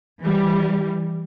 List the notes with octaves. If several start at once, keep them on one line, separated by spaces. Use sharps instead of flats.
E3 G3